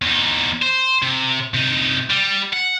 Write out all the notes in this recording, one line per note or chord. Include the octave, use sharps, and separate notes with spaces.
E2 D#4
C5
C3
C3 D#4
G3
F#5